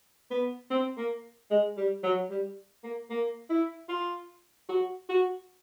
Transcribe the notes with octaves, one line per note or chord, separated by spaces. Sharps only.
B3
C4
A#3
G#3
G3
F#3
G3
A#3
A#3
E4
F4
F#4
F#4